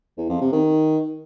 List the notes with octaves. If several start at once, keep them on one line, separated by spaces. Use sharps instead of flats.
E2
F2
C3
D#3